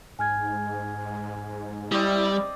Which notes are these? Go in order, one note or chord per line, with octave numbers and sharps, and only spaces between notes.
G#2 G#5 F6 G#6
G3 C4 E4 D5 D#5